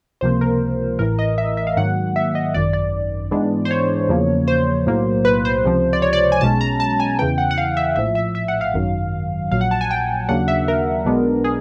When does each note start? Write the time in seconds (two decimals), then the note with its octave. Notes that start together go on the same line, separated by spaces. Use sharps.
0.21 C#2 C3 F3 A#3 C5
0.41 A#4
0.99 A1 A2 E3 A#4
1.19 D#5
1.38 E5
1.57 E5
1.67 F5
1.77 G#2 D#3 F#3 A#3 F#5
2.16 E5
2.35 D#5
2.54 G#1 F#2 D#3 D5
2.73 D5
3.31 G#2 E3 G#3 B3 D4
3.65 C5
3.71 C#5
4.09 E2 C#3 F3 A#3
4.48 C5
4.87 B1 A2 F#3 A#3
5.25 B4
5.45 C5
5.64 C#2 C3 F3
5.93 D5
6.02 C#5
6.13 D5
6.32 G#5
6.41 B1 B2 G#3 C#4 A5
6.61 A#5
6.80 A5
7.00 G#5
7.19 E2 C#3 E3 G5
7.38 F#5
7.51 F#5
7.58 F5
7.77 E5
7.96 A#1 A2 F3 E5
8.15 E5
8.35 E5
8.48 F#5
8.61 F5
8.74 G#1 F#2 D#3 F#3
9.51 A#1 A#2 F#3 F5
9.61 F#5
9.71 A5
9.81 G#5
9.91 G5
10.29 D#2 C#3 F#3 A#3 D4 F#5
10.48 E5
10.68 A#4
11.06 B1 B2 G#3 B3 D4
11.44 G#4